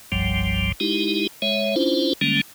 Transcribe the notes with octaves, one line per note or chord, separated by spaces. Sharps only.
F#1 C2 G2 F3 G3
G#3 D#4 E4 G4
G#3 C#5 E5
C#4 D4 E4 F4 C5
D3 G3 G#3 A#3 C#4